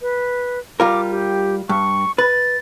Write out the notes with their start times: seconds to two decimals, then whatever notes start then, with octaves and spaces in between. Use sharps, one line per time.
0.01 B4
0.80 G3 F4 A#4 D6
1.10 G4
1.69 G2 C#6
2.18 B4 A6